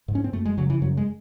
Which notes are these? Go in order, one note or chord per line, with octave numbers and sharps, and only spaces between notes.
G#2
C#4
C4
F#2 A3
G#3
C#3 F#3
E3
F#2 F#3
G#3